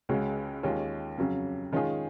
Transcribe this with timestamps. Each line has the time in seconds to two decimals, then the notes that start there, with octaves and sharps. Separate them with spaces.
0.09 C#2 C#3 G#3 C#4 F#4
0.63 D#2 D#3 G#3 C#4 F4
1.17 F2 C#3 F#3 C#4
1.73 D#3 G#3 C#4 F4 G#4